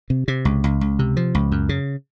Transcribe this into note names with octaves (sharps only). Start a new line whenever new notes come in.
C3
C3
C#2
C#2
C#2
C3
F3
C#2
F#2
C#3